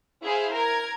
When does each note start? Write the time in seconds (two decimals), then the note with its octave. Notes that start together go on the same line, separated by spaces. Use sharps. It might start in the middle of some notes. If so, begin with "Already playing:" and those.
0.23 E4 G#4 C5 F5
0.53 A#4 G#6